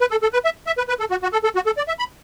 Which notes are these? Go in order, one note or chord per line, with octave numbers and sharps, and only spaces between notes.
B4
A4
A4
B4
E5
E5
B4
B4
A4
F#4
F#4
A4
A4
F#4
A4
D5
E5
B5